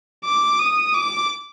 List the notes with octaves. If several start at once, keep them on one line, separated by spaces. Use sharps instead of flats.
D6
D#6
D6